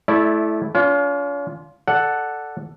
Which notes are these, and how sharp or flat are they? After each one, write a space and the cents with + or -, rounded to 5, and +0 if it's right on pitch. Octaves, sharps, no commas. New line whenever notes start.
A3 -20 E4 +0 D5 +0
C#4 +45 F4 +0
A4 +0 D5 +0 F#5 +0